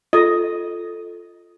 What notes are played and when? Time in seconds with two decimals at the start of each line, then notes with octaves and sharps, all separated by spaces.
0.13 F4 A4 D#5